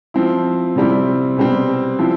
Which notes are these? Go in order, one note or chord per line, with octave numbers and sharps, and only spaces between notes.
F3 C4 E4
C3 G3 C4 E4
B2 G3 C4
F3 C4 E4